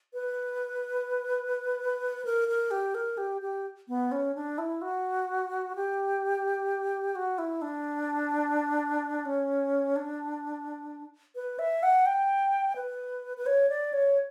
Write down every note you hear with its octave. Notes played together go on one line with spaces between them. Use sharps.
B4
A#4
A#4
G4
A#4
G4
G4
B3
C#4
D4
E4
F#4
G4
F#4
E4
D4
C#4
D4
B4
E5
F#5
G5
B4
B4
C#5
D5
C#5